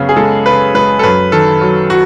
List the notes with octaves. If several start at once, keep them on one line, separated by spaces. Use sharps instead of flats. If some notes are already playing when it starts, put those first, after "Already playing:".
Already playing: F#2 C#3 B3
G#4
G#3 A4
C#3 B4
G#3 B4
A4
F#2 B4
D#3 A4
F#3
F#4